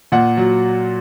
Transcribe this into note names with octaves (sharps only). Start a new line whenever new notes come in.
A#2 F#5
F#3